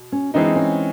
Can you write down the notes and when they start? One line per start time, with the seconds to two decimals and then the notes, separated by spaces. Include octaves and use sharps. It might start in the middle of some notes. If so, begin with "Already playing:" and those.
Already playing: B2
0.12 C#4
0.34 E3 G#3 C4 D4 D#4
0.56 C#4